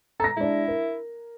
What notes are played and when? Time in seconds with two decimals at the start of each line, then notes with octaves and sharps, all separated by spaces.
0.20 A4 A#5 A#6
0.37 G#3 D4 E4
0.68 A#4